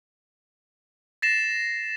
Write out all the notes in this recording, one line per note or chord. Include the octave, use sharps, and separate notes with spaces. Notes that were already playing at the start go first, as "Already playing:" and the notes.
A6 A#6 C7 E7